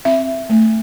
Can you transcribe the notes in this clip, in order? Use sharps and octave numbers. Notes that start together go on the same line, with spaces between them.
C4 E5
A3